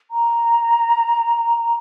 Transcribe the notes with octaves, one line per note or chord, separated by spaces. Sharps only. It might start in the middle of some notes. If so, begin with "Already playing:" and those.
A#5